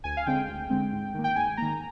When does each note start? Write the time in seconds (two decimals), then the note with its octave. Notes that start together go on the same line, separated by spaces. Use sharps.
0.04 D2 G#5
0.17 F5
0.26 D3 G#3 C4 G5
0.48 D2
0.70 D3 G#3 C4
0.92 G#2
1.14 D#3 A#3
1.24 G5
1.36 G#2 G#5
1.57 D#3 A#3 A#5